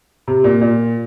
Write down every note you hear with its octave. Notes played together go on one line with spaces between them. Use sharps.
C3
A#2
A#2